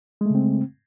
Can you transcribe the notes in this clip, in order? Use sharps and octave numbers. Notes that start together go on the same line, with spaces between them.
C#3 G#3 A3 C4